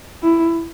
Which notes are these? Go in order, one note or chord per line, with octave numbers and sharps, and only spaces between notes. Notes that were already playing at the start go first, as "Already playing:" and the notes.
E4